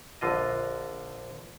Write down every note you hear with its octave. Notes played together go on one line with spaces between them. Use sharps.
A#1 D3 F4 D#5